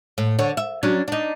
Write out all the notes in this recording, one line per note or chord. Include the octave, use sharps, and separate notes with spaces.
A2
D3 C#5
E5
F#3 C#4 D4
D4 D#4